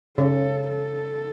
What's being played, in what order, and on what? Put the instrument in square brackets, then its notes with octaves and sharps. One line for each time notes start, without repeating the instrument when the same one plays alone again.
[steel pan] C#3 [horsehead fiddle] A4
[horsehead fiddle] A4